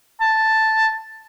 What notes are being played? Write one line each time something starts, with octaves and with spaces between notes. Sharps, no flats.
A5